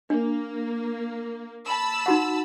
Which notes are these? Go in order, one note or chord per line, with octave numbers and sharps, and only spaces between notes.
A#3 D4
A5 B5 E6
D#4 F#4 F#5